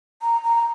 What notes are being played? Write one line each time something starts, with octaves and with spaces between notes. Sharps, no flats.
A#5
A#5